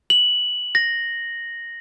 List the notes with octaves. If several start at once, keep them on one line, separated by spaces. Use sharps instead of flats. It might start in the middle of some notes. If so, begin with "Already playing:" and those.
F#7
A#6